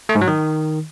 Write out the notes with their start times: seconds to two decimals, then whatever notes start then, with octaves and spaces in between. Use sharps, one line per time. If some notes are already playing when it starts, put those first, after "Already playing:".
0.09 A3
0.15 G#2
0.21 F#3
0.27 D#3